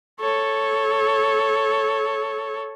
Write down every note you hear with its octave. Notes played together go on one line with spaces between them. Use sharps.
A4 C#5